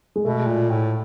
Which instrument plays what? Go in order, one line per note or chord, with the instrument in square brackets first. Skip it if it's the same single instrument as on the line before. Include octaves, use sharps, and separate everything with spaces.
[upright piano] G#3
[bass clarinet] B2 [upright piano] A3
[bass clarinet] A#2
A2